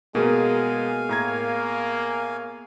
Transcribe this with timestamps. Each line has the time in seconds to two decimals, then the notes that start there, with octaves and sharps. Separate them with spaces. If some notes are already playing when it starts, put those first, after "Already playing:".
0.15 B2 G#3 A#3 B3 G#4 A#4 F5 G#5
1.09 A2 A#3 A#5 G#6